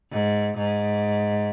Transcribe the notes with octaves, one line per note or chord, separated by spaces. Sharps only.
G#2
G#2